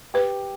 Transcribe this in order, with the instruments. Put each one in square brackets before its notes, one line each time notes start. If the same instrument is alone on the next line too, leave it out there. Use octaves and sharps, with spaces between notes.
[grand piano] G4 [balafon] B4